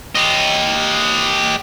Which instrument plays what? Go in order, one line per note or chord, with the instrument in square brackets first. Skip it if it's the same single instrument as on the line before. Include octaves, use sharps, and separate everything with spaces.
[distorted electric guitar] G4 D#5